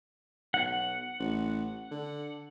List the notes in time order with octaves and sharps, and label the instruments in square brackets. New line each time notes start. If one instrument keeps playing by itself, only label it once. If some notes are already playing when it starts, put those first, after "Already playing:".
[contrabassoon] B1 [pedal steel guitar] F#5
[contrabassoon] A1
D3